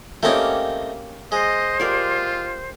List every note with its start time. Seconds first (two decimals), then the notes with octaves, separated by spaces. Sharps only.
0.23 A3 A#3 C4 C#4 D#4 G4
1.32 G#3 C5 D#5
1.80 F4 G4 A#4 D5